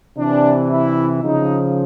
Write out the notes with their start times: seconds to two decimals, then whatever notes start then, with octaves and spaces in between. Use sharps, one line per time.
0.17 C3 E3 D4
0.69 E4
1.22 C#3 F3 D#4